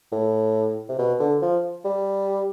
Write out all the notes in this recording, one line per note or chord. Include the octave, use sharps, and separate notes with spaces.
A2
C3
B2
D3
F3
G3